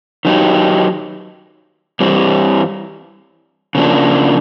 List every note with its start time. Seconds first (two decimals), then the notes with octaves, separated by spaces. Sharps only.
0.25 D#3 F#3 B3 D#4 G4
2.00 G2 E3 G3 C4
3.75 C#3 F3 A#3 D4